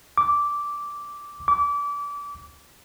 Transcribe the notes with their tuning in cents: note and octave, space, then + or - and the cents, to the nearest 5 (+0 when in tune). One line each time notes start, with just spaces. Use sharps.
D6 -10
D6 -30